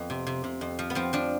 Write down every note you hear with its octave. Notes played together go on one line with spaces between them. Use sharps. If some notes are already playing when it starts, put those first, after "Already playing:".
Already playing: F2 B3
C3
C3
C3
F2
F3
B3
F3 C4
F3 D4